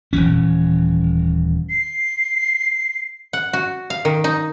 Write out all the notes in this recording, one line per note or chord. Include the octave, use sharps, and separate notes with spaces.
D#1 C2 E3 C#4
C7
F#5
F#4
F5
D#3
D#4